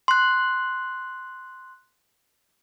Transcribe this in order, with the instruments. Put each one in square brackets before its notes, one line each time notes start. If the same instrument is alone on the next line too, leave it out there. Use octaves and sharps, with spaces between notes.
[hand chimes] C6 F#6